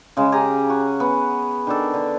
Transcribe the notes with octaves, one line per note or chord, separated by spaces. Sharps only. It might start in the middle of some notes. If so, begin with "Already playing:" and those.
C#3 G#3
G4 G#4 A#5
F#4
B3
D#3 D4 A4
D3